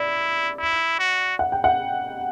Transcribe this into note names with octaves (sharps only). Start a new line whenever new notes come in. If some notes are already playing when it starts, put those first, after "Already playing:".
Already playing: E4 D5
E4
F#4
F#5
G5
F#5